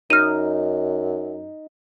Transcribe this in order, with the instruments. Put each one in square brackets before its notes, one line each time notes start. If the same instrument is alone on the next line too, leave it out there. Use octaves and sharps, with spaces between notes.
[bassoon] F#2 [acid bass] D#4 [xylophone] F6 D#7